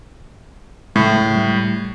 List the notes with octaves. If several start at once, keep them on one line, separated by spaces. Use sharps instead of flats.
A2 C#3 G#3
G3